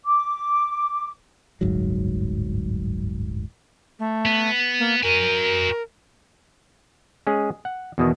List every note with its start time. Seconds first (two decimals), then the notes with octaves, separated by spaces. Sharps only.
0.04 D6
1.61 D1 G1 G#2 F#3
3.99 A3
4.26 B3
4.79 A#3
5.03 F#4 A#4 G#5
7.27 G#3 C#4 G#4
7.65 F#5
7.98 E2 B2 D#3